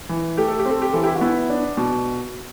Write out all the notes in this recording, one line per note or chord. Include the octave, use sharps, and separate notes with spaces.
E3
A3 G4
A4
G4
C4
A4
G4
E3 A4
E4 G4
F#4
B3 E4
D4
B2